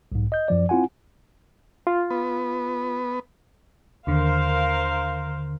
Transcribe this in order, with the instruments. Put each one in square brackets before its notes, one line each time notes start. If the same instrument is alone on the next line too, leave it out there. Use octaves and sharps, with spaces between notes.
[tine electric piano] B1 G#2
D#5 G6
F#2 F3 D5
C4 E4 F4 F#5 G#5
[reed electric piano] F4
[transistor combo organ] B3
[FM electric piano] D#2 D3 [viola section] A#4 C5 F5